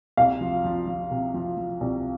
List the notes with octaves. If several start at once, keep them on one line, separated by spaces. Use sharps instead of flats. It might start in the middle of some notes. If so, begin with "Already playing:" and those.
C2 F5
F3
F3
F3
C3
F3
F3
C2